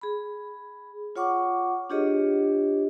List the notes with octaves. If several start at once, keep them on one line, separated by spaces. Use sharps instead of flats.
G#4 B5
F4 C#5 F#5 C#6 D6
D4 F4 G4 G#4 C#5 D#5